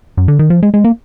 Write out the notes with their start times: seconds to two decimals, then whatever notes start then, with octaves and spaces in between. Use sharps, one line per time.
0.17 F#2
0.28 D3
0.39 D#3
0.50 F3
0.63 G#3
0.74 G#3
0.84 A#3